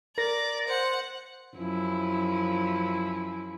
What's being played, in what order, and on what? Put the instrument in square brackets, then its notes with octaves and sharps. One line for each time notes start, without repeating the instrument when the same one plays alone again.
[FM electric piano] A#4 A#6 [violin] D5
[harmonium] C5 [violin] F#5
[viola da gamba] F#2 F3 E4